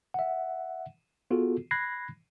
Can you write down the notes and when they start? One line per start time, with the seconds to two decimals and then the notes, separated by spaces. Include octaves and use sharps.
0.14 E5 F#5
1.31 B3 F4 F#4 G#4 A4
1.71 B5 F#6 G#6 A#6 C7